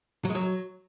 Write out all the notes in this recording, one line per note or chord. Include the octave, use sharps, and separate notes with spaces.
F#3
G#3
F#3